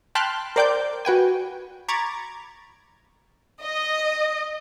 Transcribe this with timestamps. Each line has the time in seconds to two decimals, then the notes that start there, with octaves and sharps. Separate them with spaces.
0.15 G5 A5 B5 C6 F6 F#6
0.56 A#4 C5 D5 G5 D6 G6
1.05 F#4 B4 G5 G#5
1.88 A#5 B5 C#6 D6 G#6 A6
3.61 D#5